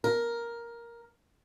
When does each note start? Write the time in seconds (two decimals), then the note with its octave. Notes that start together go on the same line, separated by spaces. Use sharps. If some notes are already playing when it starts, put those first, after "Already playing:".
0.04 A#4